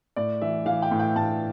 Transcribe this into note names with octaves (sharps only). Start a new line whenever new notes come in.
A2 D5
E3 E5
E3 F5
G5
A2
G5
A2 A5